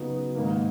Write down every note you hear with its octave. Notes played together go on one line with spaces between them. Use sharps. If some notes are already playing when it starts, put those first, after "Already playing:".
Already playing: C#3 F#3 B3 D#4 F#4
G#2 D#3 A#3